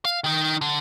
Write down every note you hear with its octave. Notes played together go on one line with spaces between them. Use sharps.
F5
D#3 D#4
D3